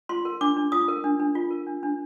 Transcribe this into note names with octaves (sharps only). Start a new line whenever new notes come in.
F4 C6
A#4
D4 D6
D4
F4 D#6
A#4
D4
D4
F4
A#4
D4
D4